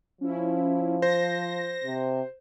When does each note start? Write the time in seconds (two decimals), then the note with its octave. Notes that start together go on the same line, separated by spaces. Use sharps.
0.21 F3 C#4 E4
1.02 C5 A#6
1.84 C3